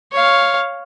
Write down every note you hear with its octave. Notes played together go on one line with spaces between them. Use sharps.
C#5 F5